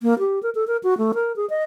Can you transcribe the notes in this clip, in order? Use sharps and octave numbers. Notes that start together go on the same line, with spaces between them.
A#3
G4
A#4
A4
A#4
F#4
A3
A#4
G#4
D#5